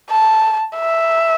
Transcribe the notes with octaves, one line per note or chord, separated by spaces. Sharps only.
A5
E5